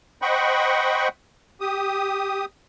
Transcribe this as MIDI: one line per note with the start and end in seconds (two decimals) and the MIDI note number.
0.22 1.08 72
0.22 1.08 75
0.22 1.08 78
0.22 1.08 79
0.22 1.08 83
0.22 1.08 85
1.61 2.45 67
1.61 2.45 87